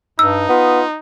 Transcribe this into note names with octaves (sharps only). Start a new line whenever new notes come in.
G2 D#4 E6
B3 F4